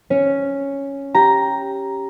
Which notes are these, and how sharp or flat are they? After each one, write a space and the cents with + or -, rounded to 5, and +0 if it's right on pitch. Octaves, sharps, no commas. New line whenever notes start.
C#4 +0 C#5 +0
G4 +0 A#5 +5